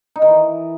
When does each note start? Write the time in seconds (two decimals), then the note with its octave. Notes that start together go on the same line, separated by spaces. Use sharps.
0.16 D#4
0.22 D#3
0.28 E3